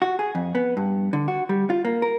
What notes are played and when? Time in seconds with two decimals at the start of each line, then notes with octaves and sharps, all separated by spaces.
0.02 F#4
0.19 G#4
0.35 F2
0.55 B3
0.77 G2
1.13 D3
1.28 F#4
1.49 G3
1.70 F4
1.85 A#3
2.02 A#4